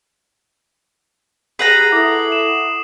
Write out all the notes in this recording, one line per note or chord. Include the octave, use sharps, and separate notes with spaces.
G4 G#4 B4 F#5 A#5 C7 F#7
E4 A4 D6 D#6
E7